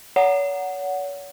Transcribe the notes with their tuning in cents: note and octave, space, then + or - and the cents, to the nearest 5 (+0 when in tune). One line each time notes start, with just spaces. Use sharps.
C#5 +40 F#5 +0